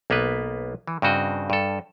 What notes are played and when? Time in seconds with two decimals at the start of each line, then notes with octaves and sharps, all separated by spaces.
0.10 B1 A#3 B3 B4
0.87 E3
1.02 G2 C#3 C4 F#4 D#5
1.50 G2 A4